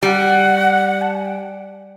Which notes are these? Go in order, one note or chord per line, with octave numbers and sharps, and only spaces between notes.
G3 F#5 G5
A5
G#5
G5